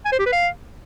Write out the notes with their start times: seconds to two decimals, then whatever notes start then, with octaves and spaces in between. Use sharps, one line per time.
0.05 G#5
0.12 C5
0.19 G4
0.26 B4
0.33 F5